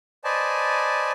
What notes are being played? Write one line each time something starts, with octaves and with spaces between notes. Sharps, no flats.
B4 C5 D5 D#5 G#5 A5